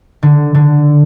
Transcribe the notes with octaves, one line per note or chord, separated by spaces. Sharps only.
D3
D3